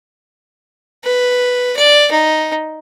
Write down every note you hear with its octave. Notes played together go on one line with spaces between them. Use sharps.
B4
D5
D#4